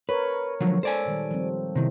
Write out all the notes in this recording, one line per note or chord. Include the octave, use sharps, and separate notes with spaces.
A#4 B4 C#5
D3 F3 F#3 G#3
A4 C5 D5 G#5
A#2 D#3 G3
F3 G3 C4
C3 D#3 B3 C4 E4